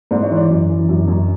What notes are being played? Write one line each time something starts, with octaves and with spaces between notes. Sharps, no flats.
G#2 D5
C#5
E3
D5
F#2
E3
F#2
F#2